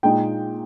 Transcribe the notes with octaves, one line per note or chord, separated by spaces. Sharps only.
A#2 G#3 D#4 G5